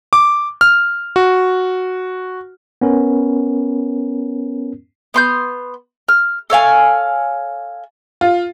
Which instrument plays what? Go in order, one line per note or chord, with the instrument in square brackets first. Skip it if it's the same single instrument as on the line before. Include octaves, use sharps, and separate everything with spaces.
[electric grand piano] D6
F6
F#4
[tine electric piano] B3 C#4 A#4
[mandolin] B3 C6 G6
F6
A4 C#5 F5 G#5
[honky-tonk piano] F4